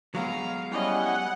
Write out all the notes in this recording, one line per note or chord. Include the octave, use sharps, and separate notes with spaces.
F#3 G#3 B3 F5 A#5
G3 C#4 E4 D#5 F#5 G#5